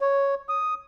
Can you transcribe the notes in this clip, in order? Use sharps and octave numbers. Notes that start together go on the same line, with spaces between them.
C#5
D#6